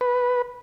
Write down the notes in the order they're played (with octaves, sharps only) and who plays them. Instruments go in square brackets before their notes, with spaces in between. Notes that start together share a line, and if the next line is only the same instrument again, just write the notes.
[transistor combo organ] B4